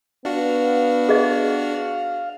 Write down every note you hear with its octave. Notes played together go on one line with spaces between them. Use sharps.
B3 D4 F#4 F5
G#4 D#5